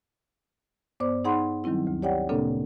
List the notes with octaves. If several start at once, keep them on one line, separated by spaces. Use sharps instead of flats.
G2 B3 C5 D5 D6
D#4 G#4 F#5 B5 C6
D#3 F#3 G3 C4 E4
D2
G4 C#5 D5 F#5 G5
A#2 C#3 A#3 C4 D4 A4